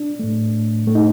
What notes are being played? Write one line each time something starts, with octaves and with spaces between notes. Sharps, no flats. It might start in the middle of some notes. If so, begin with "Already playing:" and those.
Already playing: D4
A2 A3
A2 A3
D#4